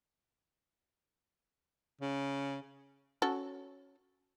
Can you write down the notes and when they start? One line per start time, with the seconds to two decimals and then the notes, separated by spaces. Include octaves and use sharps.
2.01 C#3
3.22 C#4 F#4 A4